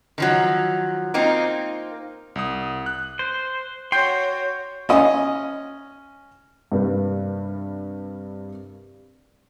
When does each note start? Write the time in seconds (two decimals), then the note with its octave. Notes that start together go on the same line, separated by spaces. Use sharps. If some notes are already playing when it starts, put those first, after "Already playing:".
0.18 D#3 F3 F#3
1.14 A#3 C4 D#4 F4
2.35 C2 D#6
2.86 F#6
3.19 C5
3.92 F#4 C#5 G5 C6 G6
4.89 C#4 D#5
6.72 G2 C3 G3 A#3 B4